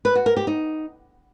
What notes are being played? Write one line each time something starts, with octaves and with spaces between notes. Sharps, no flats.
B4
F#4
A#4
G4
D#4